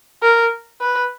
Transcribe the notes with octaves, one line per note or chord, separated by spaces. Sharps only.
A#4
B4